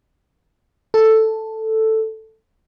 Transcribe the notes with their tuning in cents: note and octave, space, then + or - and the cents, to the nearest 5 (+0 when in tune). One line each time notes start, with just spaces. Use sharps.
A4 +5